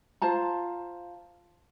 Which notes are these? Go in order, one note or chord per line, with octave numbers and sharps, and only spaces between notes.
F4 C5 A5 A#5